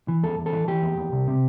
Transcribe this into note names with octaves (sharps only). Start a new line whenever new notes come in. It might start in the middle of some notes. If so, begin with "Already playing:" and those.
E3
E2 A4
E2
A4
E3
E3 G4
E2
E2
C2
C3